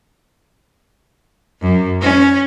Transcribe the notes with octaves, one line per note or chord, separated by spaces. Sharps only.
F#2
C#4